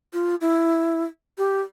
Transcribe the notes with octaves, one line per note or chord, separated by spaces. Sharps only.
F4
E4
G4